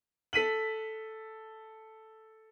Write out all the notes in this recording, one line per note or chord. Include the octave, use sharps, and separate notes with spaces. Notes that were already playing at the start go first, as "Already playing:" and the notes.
A4 B6 D#7 F#7